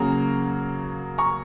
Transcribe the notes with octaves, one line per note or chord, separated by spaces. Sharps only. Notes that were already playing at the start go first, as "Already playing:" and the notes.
Already playing: C#3 F#3 A#3 A#5
A#5 C#6